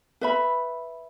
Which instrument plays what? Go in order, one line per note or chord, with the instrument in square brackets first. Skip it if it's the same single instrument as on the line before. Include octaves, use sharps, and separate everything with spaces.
[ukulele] B4 E5 B5